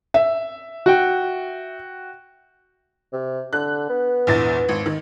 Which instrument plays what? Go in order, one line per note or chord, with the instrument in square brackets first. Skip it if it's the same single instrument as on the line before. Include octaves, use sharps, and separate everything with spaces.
[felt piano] E5
[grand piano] F#4 G5
[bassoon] C3
[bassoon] D3 [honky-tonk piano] F#6
[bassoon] B3
[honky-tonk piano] A#1 E2 A6
G#1
D#3